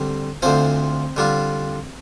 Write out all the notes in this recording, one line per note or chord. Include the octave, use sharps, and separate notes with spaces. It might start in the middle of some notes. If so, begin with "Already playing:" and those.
Already playing: D3 G3 C4
D2 D3 F3 C4 C5
D3 G3 D4 F4